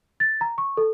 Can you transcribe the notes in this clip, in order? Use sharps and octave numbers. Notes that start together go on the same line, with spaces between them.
A6
A#5
C#6
A4